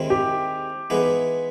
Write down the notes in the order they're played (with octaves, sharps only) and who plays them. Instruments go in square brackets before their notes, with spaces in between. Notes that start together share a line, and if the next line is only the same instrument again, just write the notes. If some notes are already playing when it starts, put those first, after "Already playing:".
Already playing: [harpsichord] D#2 D#3 G#3 C4 E4
[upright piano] G4
[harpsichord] E3 G#3 B3 D#4 G#4